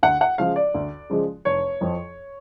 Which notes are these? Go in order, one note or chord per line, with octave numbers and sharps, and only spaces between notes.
D2 F#5
F#5
C#3 F3 G#3 F5
D5
D2
C#3 F3 G#3
F1 C#5
F2 F3